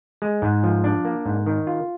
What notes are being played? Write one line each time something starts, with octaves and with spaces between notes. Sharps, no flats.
G#3
G#2
F3
D4
A#3
G#2
D#3
F4